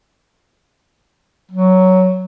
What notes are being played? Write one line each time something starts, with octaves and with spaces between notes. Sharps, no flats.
F#3